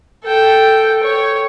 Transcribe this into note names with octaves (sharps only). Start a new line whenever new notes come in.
A4 G5
C#5